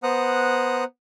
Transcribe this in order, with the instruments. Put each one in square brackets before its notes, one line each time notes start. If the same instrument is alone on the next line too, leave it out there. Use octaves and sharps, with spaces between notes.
[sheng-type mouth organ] B3 C5 F#5 A#5 D#6 F#6